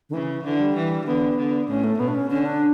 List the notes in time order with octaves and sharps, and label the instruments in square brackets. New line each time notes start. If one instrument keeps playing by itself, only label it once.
[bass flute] D3
[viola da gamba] C#3 [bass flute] E3
[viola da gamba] D3 [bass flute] E3
[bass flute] G3
[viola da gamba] E3
[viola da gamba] D3 [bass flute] B3
[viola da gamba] D3
[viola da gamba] A2 [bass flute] C#4
[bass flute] A3
[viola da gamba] B2 [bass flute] B3
[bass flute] D4
C#4
[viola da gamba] D3 [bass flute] C#4
[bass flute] D4